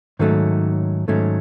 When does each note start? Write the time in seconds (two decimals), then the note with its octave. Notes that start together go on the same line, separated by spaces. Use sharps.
0.19 G#2 D#3 F#3 A3 C#4
1.08 G#2 D#3 F#3 A3 C#4